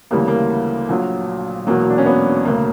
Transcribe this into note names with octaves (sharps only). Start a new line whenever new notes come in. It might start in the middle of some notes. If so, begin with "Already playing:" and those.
D2 C#3 E3 G3 A#3
A#3
A#1 A#2 F#3
E1 E2 B2 F#3 A#3
D4
C#4
B3
E1 D2 C#3 A#3